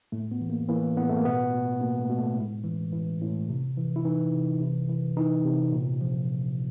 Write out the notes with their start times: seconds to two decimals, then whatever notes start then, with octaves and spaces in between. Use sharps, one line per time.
0.12 A2 A3
0.31 B3
0.41 E3
0.50 A#3
0.69 E3 A#3
0.97 A2 B3
1.09 A3
1.17 A#3
1.25 B2 B3
1.52 B2
1.81 B2 A#3
2.00 A3
2.09 B2
2.18 A3
2.37 A2 G#3
2.64 E3
2.92 E3
3.21 A2
3.49 C3
3.77 E3
3.96 E4
4.05 E3 D#4
4.33 C3
4.61 C3
4.89 E3
5.17 E3 D#4
5.44 C3
5.72 A#2
6.01 F3